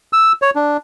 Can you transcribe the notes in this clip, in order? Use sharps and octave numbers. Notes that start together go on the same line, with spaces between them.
E6
C#5
D4